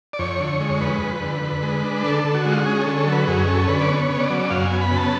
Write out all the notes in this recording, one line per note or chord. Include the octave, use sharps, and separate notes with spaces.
D5
F2 C#5
D3
G#3
F2 B4
F2
D3
D3
G#3
D4
D3 A4
D3
F#4
G#3
F4
F#4
C#4 G#4
A4
D3
A4
F#3
B4
F#2 G#4
C#4 A4
D3 B4
D5
B3 C#5
C#3
D5
F#3
F#2 F5
G#5
B3
B5
C#3
A5